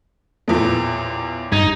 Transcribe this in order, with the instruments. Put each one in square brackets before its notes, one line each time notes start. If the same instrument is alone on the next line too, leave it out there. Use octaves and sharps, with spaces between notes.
[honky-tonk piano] A1 E2 A#2 [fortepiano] F3 A3
[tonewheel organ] G2 [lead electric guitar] D#4 [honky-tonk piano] G#6 A#6